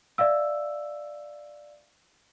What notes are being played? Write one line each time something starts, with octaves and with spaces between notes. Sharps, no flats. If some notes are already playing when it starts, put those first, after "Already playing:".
D5 E5 F5 E6